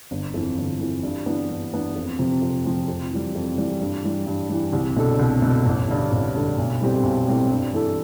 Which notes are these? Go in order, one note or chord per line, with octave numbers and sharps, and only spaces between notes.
G1
F2 E3
G1
F2 E3
G2
E3 B3 D4
G2
E3 B3 D4
F2
C3 F3 C4
F2
C3 F3 C4
F2
E3 G3
F2
E3 G3
G2
E3 G3
G2
E3 G3
C2
B2 A3 D4 A4
C2
B2 A3 D4 A4
A1
G2 D3
A1
G2 D3
B1
A2 G3 C4 G4
B1
A2 G3 C4 G4
G2
E3 A3 E4 A4